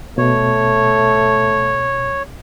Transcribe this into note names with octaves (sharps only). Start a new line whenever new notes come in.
B2 A3 C#5